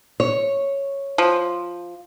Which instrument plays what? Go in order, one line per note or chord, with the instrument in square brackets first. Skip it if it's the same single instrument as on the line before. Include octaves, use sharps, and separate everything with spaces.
[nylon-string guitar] C#5
[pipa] F3